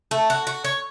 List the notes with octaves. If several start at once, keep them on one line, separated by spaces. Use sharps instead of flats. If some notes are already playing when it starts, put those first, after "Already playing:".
A3
F#4
F#4
C#5